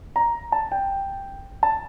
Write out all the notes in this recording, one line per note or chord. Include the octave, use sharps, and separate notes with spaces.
A#5
A5
G5
A5